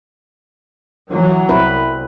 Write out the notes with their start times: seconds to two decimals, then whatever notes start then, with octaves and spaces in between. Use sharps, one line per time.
1.10 E3 F#3
1.49 C2 C4 E4 B4